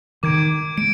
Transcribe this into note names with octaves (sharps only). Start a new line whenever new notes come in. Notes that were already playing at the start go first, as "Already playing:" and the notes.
D#3 D6 G#6 D7
G#3 D7